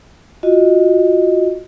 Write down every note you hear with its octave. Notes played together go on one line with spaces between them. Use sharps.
F4 F#4 D#5